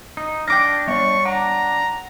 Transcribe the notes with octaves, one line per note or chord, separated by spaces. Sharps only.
D#4
D4 G5 D6 F6 A#6
G3 C#5 C#6
D4 F#5 A#5